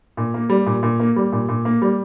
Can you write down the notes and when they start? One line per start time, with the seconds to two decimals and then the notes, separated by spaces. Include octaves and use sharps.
0.17 A#2
0.34 A#3
0.50 G3
0.66 A#2
0.83 A#2
1.00 A#3
1.16 G3
1.32 A#2
1.49 A#2
1.65 A#3
1.82 G3